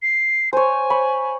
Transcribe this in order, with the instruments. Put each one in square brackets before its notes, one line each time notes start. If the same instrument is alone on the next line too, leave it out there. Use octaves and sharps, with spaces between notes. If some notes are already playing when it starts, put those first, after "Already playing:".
[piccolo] C7
[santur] C5 C#5 [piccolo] G#5
[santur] C#5 B5